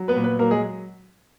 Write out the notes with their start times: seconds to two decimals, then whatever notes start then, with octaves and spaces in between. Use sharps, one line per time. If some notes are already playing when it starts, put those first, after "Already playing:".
Already playing: F#3
0.08 B3 B4
0.16 A#2
0.24 B3 B4
0.39 F#3 A#3 A#4
0.51 G#3 G#4